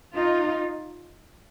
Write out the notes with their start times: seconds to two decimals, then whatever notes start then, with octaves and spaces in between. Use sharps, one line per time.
0.14 D#4 F4